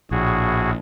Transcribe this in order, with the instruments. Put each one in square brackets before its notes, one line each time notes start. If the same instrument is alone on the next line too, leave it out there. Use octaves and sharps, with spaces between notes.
[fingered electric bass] A#1 [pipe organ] A2 F#4 G#4